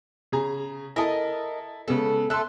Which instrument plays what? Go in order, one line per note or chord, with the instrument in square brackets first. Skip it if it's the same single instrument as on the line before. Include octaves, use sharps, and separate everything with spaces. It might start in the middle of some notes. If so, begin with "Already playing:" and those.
[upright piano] C#3 G#4 A#5
[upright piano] E4 A4 [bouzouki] A#4 D#5
[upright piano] C#3 G#3 B3 [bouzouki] A4
[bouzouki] A3 A4 [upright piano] C6 F#6